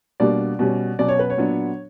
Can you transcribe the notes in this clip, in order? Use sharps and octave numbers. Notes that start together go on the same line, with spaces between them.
B2 G3 A#3 D4 D5
B2 G3 C#4
B2 F#3 C#4 D5
C#5
B4
C#5
A#2 F#3 B3 D4